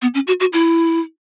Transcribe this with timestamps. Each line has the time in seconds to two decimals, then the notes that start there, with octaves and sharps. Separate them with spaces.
0.02 B3
0.14 C#4
0.27 F#4
0.40 F#4
0.53 E4